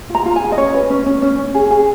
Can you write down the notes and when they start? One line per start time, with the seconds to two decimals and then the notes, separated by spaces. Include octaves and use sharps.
0.10 F4
0.15 A#5
0.26 F4
0.36 G#5
0.42 G#4
0.52 D#5
0.58 C#4 C#5
0.74 B4
0.90 C#4
1.06 C#4
1.22 C#4
1.39 C#4
1.54 G#4
1.70 G#4